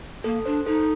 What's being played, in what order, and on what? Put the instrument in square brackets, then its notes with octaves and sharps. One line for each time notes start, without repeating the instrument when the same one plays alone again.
[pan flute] A#3 [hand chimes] A4
[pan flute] D4 [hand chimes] C5
[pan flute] D#4 [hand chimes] A4